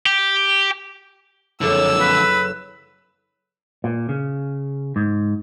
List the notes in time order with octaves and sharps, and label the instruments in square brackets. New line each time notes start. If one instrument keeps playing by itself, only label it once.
[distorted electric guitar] G4
[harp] F#1 E4 A4 [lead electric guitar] F2 D3 [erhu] E6
[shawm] B4
[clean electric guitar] A#2
C#3
G#2